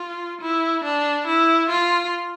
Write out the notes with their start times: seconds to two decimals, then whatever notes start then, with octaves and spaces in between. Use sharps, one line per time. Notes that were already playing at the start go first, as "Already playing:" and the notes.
Already playing: F4
0.41 E4
0.84 D4
1.27 E4
1.70 F4